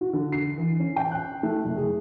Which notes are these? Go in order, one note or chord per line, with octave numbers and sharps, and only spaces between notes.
F#4
D3
C7
E3
C#4
G5
F#6
A3
F#1
G#4